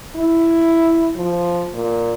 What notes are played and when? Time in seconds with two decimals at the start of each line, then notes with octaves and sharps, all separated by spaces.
0.16 E4
1.16 F3
1.74 A#2